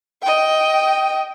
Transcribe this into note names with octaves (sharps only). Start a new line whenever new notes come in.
D#5 G5